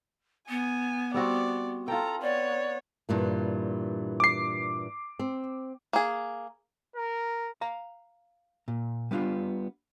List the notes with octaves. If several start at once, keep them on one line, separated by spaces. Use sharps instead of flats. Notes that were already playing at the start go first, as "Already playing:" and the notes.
B3 G#5
G3 C4 F#4 D5
F4 A4 G5 A#5
B3 C#5 D5
G2 A#2 E3
D6 C7
C4
A#3 G#4
A#4
F5 A#5
A#2
G3 B3 D4 D#4 F4